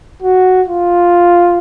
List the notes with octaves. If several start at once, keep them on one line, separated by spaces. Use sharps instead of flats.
F#4
F4